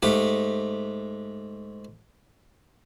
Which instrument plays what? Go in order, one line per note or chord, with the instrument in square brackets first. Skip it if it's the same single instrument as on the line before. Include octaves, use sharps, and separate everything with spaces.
[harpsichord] G#2 A3 G4